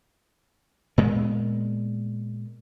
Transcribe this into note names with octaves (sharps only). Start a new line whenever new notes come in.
A#2 G#3 B3